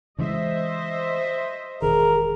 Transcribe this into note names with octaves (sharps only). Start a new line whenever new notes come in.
C#3 E3 G#3 C5 D#5 E5
E1 D#3 G#4 A#4